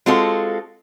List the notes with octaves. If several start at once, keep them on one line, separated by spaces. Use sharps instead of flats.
G#3 C4 F4 F#4 A4